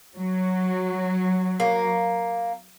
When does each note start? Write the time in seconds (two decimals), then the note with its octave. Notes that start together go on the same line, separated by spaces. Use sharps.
0.16 F#3
1.60 A#3